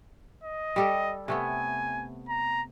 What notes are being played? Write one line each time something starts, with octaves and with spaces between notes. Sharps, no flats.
D#5
G3 G4 A4
C3 A3 B3 G#5
A#5